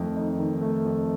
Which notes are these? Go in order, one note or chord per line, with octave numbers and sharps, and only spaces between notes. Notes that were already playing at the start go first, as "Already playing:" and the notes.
Already playing: F2 D#3 A3
D#4
D#3
A3
F2